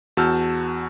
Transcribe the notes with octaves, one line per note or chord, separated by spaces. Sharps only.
E2 F#4 A5 E6 F6 G6